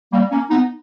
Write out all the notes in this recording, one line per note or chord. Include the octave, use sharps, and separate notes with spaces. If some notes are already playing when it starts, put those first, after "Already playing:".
G3 A#3
A#3 C#4
B3 D#4